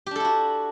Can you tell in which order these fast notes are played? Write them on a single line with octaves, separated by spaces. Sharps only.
G4 D4 A4 E4 F#4